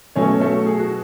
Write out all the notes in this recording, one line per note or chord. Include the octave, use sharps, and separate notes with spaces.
B2 F#3 A3 C#4 C#5
A3 A4
G#4
F#4